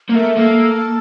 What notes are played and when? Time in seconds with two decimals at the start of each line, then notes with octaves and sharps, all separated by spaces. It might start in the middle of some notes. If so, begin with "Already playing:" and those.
0.10 A#3
0.14 A3 A#4
0.37 A#3 A4